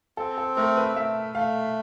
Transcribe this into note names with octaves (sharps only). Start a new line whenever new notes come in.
C4 A4
A4
A3 A#4
B4
A3 E5
A3 F5